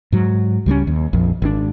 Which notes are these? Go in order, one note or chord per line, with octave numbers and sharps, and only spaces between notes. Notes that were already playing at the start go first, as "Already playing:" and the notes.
G#2 F#3
C#2 G3 G#3 C#4
D#2
A#1 F2
G#1 D4